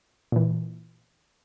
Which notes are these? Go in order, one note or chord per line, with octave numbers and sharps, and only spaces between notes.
A#2 E3